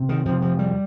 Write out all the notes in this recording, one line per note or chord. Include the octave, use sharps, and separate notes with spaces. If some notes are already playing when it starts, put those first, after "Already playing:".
Already playing: C3
D#3
F2 C3 F3
F3
G3